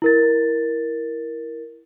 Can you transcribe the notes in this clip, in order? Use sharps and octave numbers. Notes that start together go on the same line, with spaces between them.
E4 A#4 A6